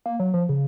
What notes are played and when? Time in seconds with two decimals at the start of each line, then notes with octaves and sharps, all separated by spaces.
0.06 A#3
0.20 F#3
0.34 F3
0.49 C#3